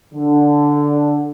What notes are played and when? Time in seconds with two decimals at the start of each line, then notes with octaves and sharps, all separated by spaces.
0.14 D3